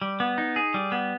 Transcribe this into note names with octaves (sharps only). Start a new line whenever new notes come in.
G3
B3
D#4
G#4
G3
B3